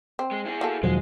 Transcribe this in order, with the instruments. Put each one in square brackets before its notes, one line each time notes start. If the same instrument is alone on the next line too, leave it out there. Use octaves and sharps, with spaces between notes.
[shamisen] C4
[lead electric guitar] G#3
E4 G#4
[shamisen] A#3 F#4 A4
[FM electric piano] E2 D#3 F#3 [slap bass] B2 F3 [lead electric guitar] G#3